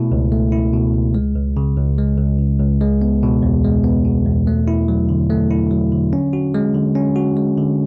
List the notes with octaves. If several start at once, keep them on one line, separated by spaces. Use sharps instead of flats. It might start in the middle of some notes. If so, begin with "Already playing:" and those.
Already playing: B2 A3 E4
C#2
A3
E4
B2
C#2
G#3
C#2
C#3
C#2
G#3
C#2
C#3
C#2
G#3
B3
B2
E2
G#3
B3
B2
E2
A3
E4
F#3
D3
A3
E4
F#3
D3
C#4
F#4
G#3
D3
C#4
F#4
G#3
D3